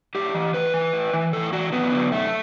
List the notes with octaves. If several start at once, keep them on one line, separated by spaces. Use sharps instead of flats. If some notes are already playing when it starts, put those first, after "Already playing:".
A2 G4
E3
A2 B4
E3
A2
E3
A2 A4
E3 F#4
F#2 B3
D3 F#3
F#2 A3